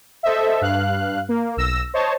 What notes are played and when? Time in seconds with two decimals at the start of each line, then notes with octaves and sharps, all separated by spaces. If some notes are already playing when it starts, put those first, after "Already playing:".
0.23 A4 C5 D#5 E5
0.61 G2 F5 F#6
1.29 A#3
1.57 B1 E6 A#6
1.94 C5 C#5 D#5 A5